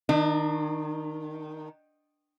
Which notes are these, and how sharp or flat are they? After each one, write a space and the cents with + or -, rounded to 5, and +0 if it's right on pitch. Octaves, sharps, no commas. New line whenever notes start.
D#3 +0 D4 +35